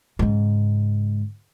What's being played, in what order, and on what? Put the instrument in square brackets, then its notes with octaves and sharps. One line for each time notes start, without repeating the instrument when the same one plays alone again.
[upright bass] G#2 C#3